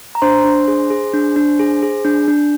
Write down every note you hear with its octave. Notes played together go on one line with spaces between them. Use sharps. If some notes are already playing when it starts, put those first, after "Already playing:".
A#5
D4 C5 C6
D4
G#4
G#4
D4
D4
G#4
G#4
D4
D4